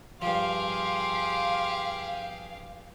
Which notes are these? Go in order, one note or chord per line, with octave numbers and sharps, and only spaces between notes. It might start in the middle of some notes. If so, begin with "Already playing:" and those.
G2 F3 G4 G#4 F5 C6